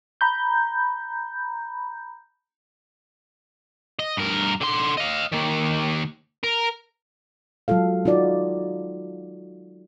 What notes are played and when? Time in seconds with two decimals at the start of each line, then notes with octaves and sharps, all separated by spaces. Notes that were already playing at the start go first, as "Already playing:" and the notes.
0.21 A#5 B5 G6
3.99 D#5
4.17 G2 A#4
4.61 D3 C6
4.98 D#5 F5
5.33 D#3 A#3
6.44 A#4
7.68 F#3 G#3 F4 A4 F5
8.05 D#4 F4 F#4 D5